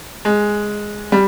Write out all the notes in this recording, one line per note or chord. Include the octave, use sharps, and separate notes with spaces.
G#3
G3